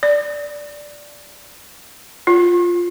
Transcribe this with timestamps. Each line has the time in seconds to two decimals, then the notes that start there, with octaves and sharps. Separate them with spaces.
0.03 D5
2.27 F4